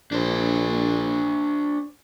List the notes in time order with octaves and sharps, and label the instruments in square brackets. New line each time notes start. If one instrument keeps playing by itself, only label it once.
[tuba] A#1 [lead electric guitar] D4 C5